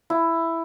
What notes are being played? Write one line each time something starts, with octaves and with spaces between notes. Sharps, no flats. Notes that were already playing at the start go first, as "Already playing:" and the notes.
E4